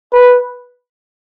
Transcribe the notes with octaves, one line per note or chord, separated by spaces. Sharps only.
B4